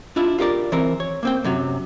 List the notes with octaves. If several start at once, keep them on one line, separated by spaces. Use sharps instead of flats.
D4 E4 F4 E5
F4 G4 A#4 D5
E3 C4 A#4
C#5
A#3 C4 G5
F#2 C3 F#3